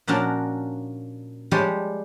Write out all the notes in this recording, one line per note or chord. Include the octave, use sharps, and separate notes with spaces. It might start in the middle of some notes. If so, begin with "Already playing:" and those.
A#2 F3 C#4 D4 F#4 A#4
F3 G3 G#3 G4 C#5